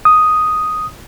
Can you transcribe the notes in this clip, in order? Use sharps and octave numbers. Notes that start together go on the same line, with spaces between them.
D#6